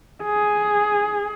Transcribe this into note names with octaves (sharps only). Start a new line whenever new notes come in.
G#4